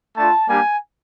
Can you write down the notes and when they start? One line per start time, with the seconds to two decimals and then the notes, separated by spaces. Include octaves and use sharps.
0.16 A3 D4 F4 A5
0.48 G3 A#3 D4 G4 G#5